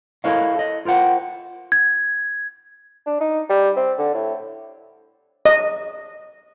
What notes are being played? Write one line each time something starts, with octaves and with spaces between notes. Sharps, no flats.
E4 A4 A#4 C#5 D#5 F5
A4 D#5
F4 A#4 C5 F#5 G5
G#6
D4
D#4
G3
C4
D3
A2
D#5